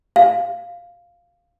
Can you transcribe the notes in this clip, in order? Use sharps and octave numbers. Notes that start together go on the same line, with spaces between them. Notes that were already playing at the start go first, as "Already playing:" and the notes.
F5